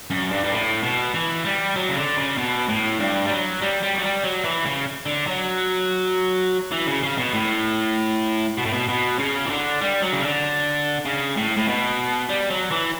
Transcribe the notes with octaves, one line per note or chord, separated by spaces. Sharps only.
F#2
G2
G2
A2
B2
E3
G3
F#3
C#3
D3
C#3
B2
A2
G2
G3
F#3
G3
G3
F#3
G3
F#3
E3
C#3
D3
F#3
E3
C#3
C#3
B2
A2
B2
A2
B2
B2
C#3
E3
D3
G3
F#3
C#3
D3
C#3
A2
A2
B2
G3
F#3
E3